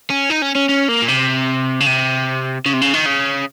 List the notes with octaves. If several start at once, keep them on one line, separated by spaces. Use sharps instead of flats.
C#4
D#4
C#4
C#4
C#4
A#3
A#2
C3
C#3
C3
C#3
C3
C#3
D#3
C#3